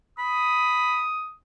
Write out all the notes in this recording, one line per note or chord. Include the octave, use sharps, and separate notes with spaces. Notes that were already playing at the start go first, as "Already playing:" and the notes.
B5 D#6